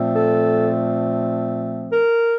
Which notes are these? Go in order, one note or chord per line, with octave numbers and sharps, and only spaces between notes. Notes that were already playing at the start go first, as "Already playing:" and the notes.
Already playing: A#2 F3 A3 C4
A4
A#4